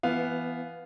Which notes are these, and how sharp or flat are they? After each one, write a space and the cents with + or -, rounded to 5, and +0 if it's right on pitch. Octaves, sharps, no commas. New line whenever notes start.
E3 +25 B3 +0 F5 +0